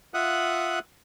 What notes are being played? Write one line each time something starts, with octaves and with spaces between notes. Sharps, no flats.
F4 E5 F#5 D#6 F#6